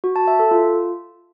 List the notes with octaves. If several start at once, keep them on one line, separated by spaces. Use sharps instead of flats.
F#4
A5
E5
A4
F4